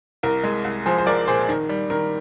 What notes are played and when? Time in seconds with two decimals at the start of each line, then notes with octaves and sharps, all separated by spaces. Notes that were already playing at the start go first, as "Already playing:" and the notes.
0.23 C2 A#4
0.44 G#3
0.64 C2
0.86 F3 G#4 C5
0.98 C5
1.06 F3 A#4 D5
1.27 A#2 G#4 C5
1.49 D#3 A#4
1.69 G3
1.90 D#3 A#4